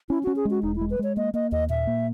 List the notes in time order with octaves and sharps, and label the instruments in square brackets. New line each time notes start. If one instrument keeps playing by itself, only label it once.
[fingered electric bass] C#4 [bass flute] E4
[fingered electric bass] C#4 [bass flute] F#4
[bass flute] G#4
[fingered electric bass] G#3
[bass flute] F#4
[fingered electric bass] E1 [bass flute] D#4
[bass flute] E4
[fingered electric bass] G#3
[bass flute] B4
[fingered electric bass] G#3 [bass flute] C#5
[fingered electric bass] A#3 [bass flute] D#5
[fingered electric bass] A#3 [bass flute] D#5
[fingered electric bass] D#2 [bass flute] D#5
[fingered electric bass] A#2 [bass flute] E5
[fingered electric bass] A#3